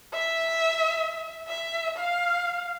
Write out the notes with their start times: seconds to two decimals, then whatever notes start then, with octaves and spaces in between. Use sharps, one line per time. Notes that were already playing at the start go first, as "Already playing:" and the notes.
0.13 E5
1.48 E5
1.97 F5